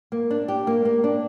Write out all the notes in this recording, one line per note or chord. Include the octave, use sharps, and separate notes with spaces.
A#3
D4
G4
A#3
A#3
D4